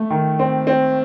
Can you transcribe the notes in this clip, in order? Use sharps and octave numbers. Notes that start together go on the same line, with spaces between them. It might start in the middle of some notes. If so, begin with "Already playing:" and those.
Already playing: A3
D#3
C4
C4